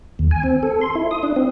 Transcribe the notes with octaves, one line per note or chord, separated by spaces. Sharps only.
D#2
G#5
C4
A4
C6
E4
D#6
D4
C4